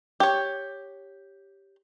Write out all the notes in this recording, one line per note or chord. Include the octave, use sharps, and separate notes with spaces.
G4 C#5